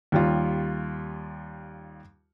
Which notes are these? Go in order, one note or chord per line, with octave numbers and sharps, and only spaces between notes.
D#2 G3 F4